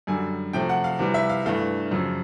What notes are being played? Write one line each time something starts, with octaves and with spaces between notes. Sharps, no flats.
F#2 D3 G3 G#5
C3 F3 A3 G5
F#5
F5
C3 E3 G3
E5
F5
G2 E3 A3 F5
F#2 C#3 F3